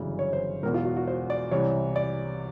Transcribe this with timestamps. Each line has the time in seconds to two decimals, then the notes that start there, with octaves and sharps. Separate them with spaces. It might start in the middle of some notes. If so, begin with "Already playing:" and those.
Already playing: G1 F#2 C#3 E3
0.19 C#5
0.33 C5
0.63 E1 E2 B2 A#4
0.74 F4
0.85 F#4
0.97 F#4
1.07 C5
1.30 D5
1.51 C2 C3 E3 C#5
1.96 D5